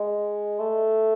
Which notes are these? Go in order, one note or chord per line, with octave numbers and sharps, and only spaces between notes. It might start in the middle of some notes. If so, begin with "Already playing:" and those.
Already playing: G#3
A3